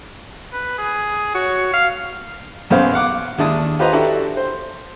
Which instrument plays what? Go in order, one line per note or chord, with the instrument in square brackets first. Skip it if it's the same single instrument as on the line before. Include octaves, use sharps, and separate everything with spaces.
[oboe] B4
G#4
[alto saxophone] F#4 [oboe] C#5
[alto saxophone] F5
[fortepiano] B1 F#2 B3 G#4 C5 F5
F5 F#5 D6
D#2 G#3 D4 E4 A5 D#6
F4 G4 B4 C5 D#5 A#5
D4 E4 F#4 G4 A4
C5